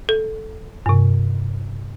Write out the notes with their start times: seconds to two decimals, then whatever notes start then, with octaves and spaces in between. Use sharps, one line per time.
0.09 A4
0.86 G2 C3